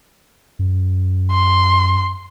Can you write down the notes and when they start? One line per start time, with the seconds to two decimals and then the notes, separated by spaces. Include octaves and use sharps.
0.59 F#2
1.31 C6